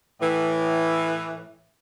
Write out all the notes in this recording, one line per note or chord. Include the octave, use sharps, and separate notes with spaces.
A2 E3